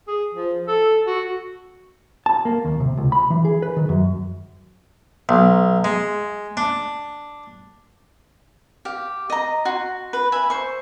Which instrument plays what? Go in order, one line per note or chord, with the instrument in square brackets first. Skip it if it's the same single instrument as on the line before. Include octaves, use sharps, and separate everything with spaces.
[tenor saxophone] G#4
F3
A4
F#4
[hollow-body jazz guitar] A5
A#3
D#2
C3
C#2
B5
E3
G#4
B4
D#3
F#2
[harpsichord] B1
G#3
D4
[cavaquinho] G4 F5
D#5 A#5
F#4 C6
B4
E5 G#5 B5
C5 C#6